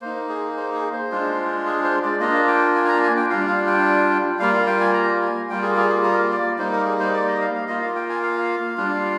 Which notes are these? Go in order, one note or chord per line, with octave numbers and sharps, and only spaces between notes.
A#3 D#4 C5
G#4
C5
G#4
C5
G#3 D4 F4
G#4
C5
D5
A#3 D4 F4 D#5
G5
G#5
G#5
A#5
G#5
G5
G3 D4 F4 F5
F5
G5
G3 A#3 F4 F5
F5
G5
G#5
A#5
G#5
G3 A#3 F4 G5
G#4
G#4
G#4
A#4
D5
G3 A#3 D#4 C5
A#4
G#4
C5
D5
D#5
F5
F5
A#3 F4 D#5
F5
G5
G#5
F5
G3 D4 F4